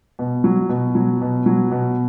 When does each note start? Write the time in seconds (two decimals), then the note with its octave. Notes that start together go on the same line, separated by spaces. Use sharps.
0.19 B2
0.44 F#3
0.69 B2
0.95 F#3
1.21 B2
1.46 F#3
1.71 B2